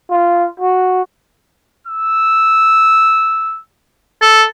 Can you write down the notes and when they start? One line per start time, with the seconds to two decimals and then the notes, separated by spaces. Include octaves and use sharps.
0.11 F4
0.60 F#4
1.87 E6
4.22 A4